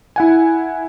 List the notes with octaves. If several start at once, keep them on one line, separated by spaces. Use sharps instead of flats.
E4 F#5 G#5